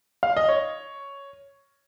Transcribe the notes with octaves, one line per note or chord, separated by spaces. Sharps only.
F5
D#5
C#5